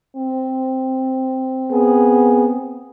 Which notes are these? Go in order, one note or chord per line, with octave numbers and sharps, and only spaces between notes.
C4
B3 G#4